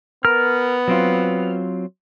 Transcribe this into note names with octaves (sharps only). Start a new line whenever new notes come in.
B3 A#4 F6
F#3 C4 F4